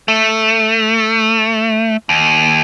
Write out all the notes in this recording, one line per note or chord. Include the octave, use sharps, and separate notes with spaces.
A3
D#2